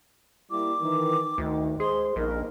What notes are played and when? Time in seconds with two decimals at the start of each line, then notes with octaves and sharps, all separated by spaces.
0.51 G3 A#3 E4 D6
0.81 D#3 E3
1.38 D2 D#3
1.80 G#3 G#4 C5 C6
2.16 A#1 G2 A#3 D#4 A#4